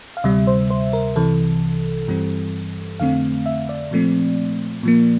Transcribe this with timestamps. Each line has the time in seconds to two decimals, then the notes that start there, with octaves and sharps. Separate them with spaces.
0.17 F5
0.24 D2 C3 G3 E5
0.47 C5
0.70 C5
0.93 A#4
1.16 C2 C3 E3 A4
2.08 G2 E3 G3 C4
3.00 F2 D3 A3 C4 F5
3.46 E5
3.69 D5
3.91 A#2 F3 A3 C4
4.83 A#2 F3 A#3